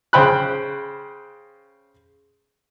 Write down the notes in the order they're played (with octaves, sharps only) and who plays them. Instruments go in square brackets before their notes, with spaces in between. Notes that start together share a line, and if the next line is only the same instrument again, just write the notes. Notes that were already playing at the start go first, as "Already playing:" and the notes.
[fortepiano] C#3 C5 G5 B5 F#6